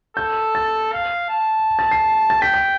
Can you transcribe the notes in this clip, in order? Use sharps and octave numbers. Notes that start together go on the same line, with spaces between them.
A4 G6
A6
F5
A5
A6
C7
A6
G5 B6
B6